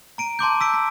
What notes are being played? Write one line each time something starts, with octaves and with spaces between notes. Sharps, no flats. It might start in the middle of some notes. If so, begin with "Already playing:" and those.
A#5 D7 D#7
A5 C6 D6 G6
E6 B6 D7
B6